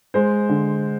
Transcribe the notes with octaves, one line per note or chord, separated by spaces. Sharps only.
G#3 C5
D3